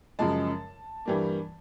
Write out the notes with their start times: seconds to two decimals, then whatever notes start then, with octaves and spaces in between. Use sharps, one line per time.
0.19 F#2 C#3 F3 G#3 A5
1.05 G2 E3 G3 A#3